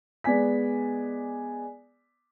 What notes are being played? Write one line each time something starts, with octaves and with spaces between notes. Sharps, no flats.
G#3 B3 D5 G#5 B6